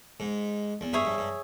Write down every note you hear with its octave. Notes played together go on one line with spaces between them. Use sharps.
G#2
E2
G2 G#4 C#5 E5
G2
G2